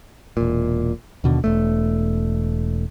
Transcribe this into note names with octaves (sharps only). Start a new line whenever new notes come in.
E1 A#2
D#2 B2 D3
E1 A3